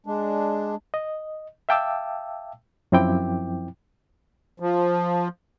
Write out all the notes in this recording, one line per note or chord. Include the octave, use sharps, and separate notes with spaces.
G#3 D4
D#5
E5 F5 G5 A5 D6 E6
F#2 F3 C4 E4 G5 D6
F3